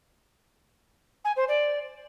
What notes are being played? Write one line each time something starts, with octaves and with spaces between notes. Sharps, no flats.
G#5
C5
D5